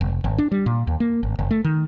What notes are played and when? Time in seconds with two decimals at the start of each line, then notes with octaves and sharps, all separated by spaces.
0.01 F1
0.24 G#1
0.38 D4
0.52 G3
0.66 A#2
0.87 D#2
1.00 A#3
1.23 G#1
1.39 F#1
1.51 A3
1.65 D#3